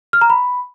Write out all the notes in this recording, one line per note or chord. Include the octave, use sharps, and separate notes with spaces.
F6
A#5
B5